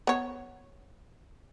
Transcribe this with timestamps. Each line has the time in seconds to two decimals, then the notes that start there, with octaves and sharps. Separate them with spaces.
0.07 B3 C#5